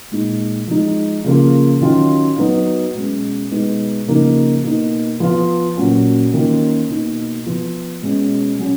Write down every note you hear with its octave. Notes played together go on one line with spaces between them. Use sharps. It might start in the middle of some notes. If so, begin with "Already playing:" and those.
A#2 G#3 D#4
F3 G#3 D#4
C#3 F3 A#3 F4
D#3 F#3 C#4 F4
F#3 B3 D#4
B2 G#3 C#4
B2 G#3 B3 D#4
C#3 F3 A#3 D#4
B2 A#3 D#4
F3 B3 F4
A#2 F#3 C#4
D#3 A#3 C#4 F4
B2 A#3 D#4
F3 B3 F4
B2 G#3 C#4
F#3 C#4